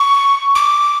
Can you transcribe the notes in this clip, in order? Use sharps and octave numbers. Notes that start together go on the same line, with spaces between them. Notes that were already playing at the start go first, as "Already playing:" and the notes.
Already playing: C#6
D6